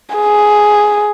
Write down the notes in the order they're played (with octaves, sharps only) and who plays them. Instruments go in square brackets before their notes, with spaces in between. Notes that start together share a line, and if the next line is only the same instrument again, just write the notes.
[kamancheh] G#4